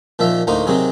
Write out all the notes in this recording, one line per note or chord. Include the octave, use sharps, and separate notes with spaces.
A#2 D#3 F3 E5
D2 A2 A#3 D#4 C5
C3 D#3 F#3 C4 G#4